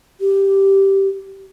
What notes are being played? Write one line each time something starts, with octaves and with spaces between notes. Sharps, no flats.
G4